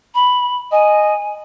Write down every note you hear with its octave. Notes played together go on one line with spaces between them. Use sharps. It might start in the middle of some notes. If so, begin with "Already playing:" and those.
B5
D#5 G#5